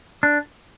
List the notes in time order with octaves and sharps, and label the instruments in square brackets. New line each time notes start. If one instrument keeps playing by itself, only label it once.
[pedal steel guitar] D4